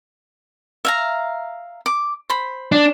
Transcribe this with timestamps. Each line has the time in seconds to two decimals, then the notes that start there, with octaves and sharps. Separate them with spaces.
0.85 E5 F5 A#5
1.86 D6
2.30 C5 B5
2.72 D4